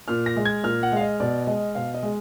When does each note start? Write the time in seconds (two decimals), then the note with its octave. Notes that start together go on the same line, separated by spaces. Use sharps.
0.08 A#2 F6
0.26 A#6
0.36 G#3
0.45 G#6
0.63 A#2 F6
0.83 F#5
0.92 G#3 F5
1.01 D#5
1.20 B2 D5
1.47 G#3 D#5
1.75 B2 F5
1.94 D#5
2.03 G#3